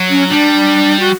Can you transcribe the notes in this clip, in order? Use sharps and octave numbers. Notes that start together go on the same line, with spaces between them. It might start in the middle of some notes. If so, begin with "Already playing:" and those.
Already playing: F#3
C#4
G3 D4
F#4